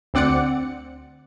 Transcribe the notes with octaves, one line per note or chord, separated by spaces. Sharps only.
D2 C4 D5 F#5 D6 C#7